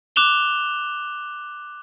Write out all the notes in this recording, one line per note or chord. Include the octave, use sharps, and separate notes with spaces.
D6 F#6 E7 F7 G7